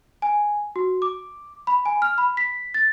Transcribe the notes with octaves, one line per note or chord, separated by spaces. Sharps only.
G#5
F#4
D6
B5
G#5
F6
B5
B6
A6